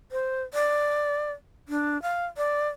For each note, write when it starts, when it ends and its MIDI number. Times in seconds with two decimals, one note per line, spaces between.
0.12 0.42 72
0.54 1.31 74
1.69 2.00 62
2.02 2.25 77
2.37 2.68 74